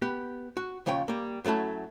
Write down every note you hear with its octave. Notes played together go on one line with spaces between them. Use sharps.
B3 G4 B4
F#4
D#2 C#3 F3 C#5 G5
G3 A#3
F#2 F#3 A3 E4 A5